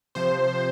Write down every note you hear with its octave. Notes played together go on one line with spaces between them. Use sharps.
C3 F3 C5